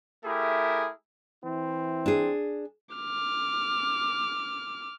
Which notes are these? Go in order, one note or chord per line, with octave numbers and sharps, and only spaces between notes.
A3 E4 G4 G#4 A#4 E5
E3 C4 E4
D4 G#4
D6 F6